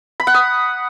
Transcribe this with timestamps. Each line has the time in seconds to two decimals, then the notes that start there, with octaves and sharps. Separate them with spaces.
0.20 B5
0.27 F#5
0.34 D#6